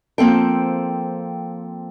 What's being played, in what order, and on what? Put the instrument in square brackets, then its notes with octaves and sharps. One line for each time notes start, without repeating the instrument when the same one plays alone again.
[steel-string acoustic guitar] F3 A#3 C4 A4 G5